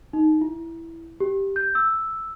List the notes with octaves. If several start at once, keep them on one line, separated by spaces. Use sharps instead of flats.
D#4
E4
G4
G6
E6